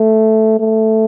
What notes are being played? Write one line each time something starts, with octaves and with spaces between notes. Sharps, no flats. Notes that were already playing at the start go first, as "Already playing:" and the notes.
Already playing: A3
A3